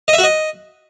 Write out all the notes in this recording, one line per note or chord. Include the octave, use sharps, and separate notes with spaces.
D#5
E5
F#4
D#5